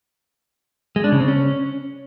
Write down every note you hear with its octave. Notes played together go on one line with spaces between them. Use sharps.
G#3
D4
C#3
C4
C#4